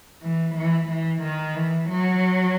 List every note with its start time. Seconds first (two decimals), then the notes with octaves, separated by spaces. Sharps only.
0.22 E3
0.55 E3
0.88 E3
1.22 D#3
1.55 E3
1.89 F#3